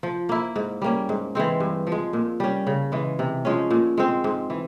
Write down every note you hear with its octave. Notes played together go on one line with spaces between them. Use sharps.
F3
A#3 E4
G#2
G3 A#3 C#4
G#2
E3 G#3 C4
G2
F3
G#3
A#2
G3 C#4
C#3
E3 G#3
C3
F3 G#3 C#4
A#2
G#3 C4
G#2
E3